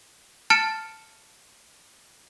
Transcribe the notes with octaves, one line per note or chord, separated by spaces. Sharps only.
A5 F6 A6 C#7 E7